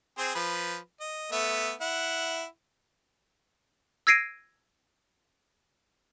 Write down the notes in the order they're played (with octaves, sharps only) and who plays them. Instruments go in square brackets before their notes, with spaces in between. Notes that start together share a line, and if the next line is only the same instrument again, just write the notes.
[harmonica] C4 G#4 C5
F3 B4
D#5
A3 B3 E5
E4 F#5
[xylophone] E6 G#6 A#6 C7 D7 D#7